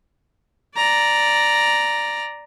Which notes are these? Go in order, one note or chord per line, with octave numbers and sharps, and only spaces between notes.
D5 A#5